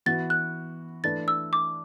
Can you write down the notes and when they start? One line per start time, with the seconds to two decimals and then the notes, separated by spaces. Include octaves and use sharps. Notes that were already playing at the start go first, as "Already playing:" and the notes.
0.06 E3 B3 F#4 A6
0.30 F#6
1.04 E3 A3 D4 B4 D5 A6
1.28 E6
1.53 D6